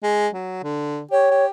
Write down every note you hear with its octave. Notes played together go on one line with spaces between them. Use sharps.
G#3
F#3
D3
G4 C#5
G4